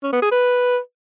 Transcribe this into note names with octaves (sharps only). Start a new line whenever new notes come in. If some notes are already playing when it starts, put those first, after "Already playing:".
C#4
B3
G#4
B4